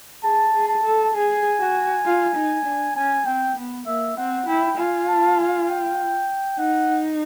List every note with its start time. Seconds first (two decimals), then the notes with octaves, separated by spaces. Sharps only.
0.23 G#4 A5
0.54 G#4
0.68 A5
0.84 A4
1.14 G#4 G#5
1.60 F#4
2.05 F4
2.36 D#4
2.65 D4
2.96 C#4 G#5
3.26 C4 G5
3.56 B3
3.86 A#3 E5
4.17 C4 F#5
4.47 E4 G5
4.77 F4 G#5
5.08 A5
5.38 G#5
5.69 G5
6.59 D#4 F#5